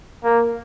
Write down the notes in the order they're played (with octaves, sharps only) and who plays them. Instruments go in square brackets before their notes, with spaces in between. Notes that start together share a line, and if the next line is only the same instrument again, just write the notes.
[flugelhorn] A#3